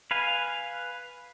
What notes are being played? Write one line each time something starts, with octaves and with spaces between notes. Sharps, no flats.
B4 F5 G#5